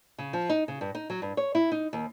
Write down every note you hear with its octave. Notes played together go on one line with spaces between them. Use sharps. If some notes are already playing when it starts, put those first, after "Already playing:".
C#3
F3
D#4
C#3
G2
D#4
F#3
G2
C#5
E4
D#4
D#2